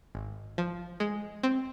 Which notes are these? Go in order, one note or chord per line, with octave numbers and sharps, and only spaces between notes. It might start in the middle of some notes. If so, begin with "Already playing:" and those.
G#1
F3
G#3
C4